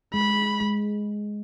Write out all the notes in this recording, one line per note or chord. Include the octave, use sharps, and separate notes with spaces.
G#3 B5
G#3